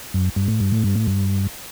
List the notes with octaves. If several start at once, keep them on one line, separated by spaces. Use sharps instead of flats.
F#2
G2
A2
G2
A2
G2
A2
G2